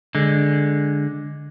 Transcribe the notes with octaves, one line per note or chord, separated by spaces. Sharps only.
D3 G#3